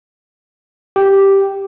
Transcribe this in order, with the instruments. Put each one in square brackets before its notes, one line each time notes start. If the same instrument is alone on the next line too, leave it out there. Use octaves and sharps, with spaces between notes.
[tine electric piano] G4